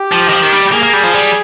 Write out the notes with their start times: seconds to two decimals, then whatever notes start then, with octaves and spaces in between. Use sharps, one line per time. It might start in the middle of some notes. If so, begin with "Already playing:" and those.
Already playing: G4
0.12 F3
0.28 D#3
0.32 F3
0.42 D#3
0.52 G3
0.72 A#3 G#4
0.83 A#3
0.93 G3
1.03 F3
1.13 G3